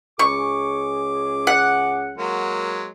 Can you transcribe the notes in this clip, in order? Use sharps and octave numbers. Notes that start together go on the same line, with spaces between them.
C#2 C#4 G#4 C#6 D6
F#5
F#3 G#3 A#3